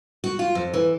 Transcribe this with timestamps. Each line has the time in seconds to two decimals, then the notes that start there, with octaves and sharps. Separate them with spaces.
0.24 F#4
0.39 F4
0.55 F2
0.74 E3